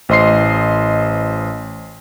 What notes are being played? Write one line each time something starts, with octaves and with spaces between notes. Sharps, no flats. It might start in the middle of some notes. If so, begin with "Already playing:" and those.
A1 C5 D#5 C6 C7